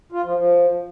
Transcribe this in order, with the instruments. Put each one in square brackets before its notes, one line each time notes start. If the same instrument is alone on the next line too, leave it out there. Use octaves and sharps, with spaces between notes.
[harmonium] F4
F3
F3